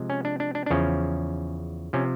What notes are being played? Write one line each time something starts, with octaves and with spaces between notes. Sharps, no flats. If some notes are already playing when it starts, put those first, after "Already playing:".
Already playing: C3 F3 G#3
C#4
D4
D4
D4
D4
E2 C#3 F3 C#4
C3 F3 C#4